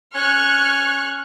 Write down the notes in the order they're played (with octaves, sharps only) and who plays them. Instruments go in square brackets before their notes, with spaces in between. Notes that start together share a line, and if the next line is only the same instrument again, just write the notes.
[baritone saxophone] C#4 [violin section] C#6 F6 F#6